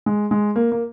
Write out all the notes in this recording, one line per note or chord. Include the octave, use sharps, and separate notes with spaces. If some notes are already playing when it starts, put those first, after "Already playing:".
G#3
G#3
A#3
A#3